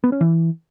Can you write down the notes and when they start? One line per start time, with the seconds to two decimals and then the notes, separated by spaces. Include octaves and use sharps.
0.04 B3
0.12 C#4
0.21 E3